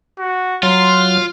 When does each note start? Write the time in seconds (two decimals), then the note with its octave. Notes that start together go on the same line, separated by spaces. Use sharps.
0.19 F#4
0.63 F#3 F4 C6 F6